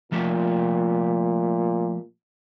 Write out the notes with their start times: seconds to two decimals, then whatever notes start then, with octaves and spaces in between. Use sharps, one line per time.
0.12 A#2 F3 A3 G4